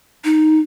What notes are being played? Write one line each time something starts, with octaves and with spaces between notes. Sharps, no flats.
D#4